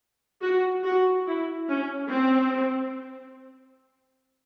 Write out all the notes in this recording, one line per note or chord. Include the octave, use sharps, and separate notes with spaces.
F#4
F#4
E4
C#4
C4